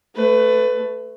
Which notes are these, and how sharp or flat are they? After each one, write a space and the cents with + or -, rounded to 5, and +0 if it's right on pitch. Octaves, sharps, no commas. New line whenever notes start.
A3 +5 B4 +20